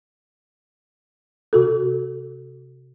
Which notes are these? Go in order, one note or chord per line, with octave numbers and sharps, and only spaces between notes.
C3 F#4 A4